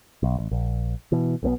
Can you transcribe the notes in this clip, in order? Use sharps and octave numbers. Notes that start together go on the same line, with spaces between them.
B1
A1
A#1
B2 E3
B1 B2 D3 B3